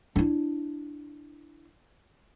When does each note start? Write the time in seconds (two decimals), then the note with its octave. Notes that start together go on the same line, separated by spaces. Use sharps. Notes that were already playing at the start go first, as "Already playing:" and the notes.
0.16 D4 E4